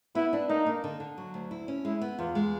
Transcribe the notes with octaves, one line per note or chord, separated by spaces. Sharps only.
B3 E4
D4
A#3 D#4
A#3
D3
D3
F#3
D2
E4
C#4
G#3 E4
B3
E2 F4
G#3